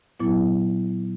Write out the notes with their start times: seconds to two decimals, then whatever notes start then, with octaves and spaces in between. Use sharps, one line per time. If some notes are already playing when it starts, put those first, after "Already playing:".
0.19 A#2 F#3 B3 E4